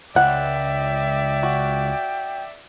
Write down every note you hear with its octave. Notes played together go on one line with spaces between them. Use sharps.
C#2 D5 E5 F#5 G5
F#4